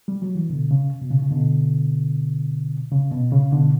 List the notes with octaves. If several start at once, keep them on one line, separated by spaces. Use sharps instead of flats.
G3
F#3
E3
B2 D3
C#3
B2
C#3
C#3
B2 D3
C#3
B2
C#3
B2 D3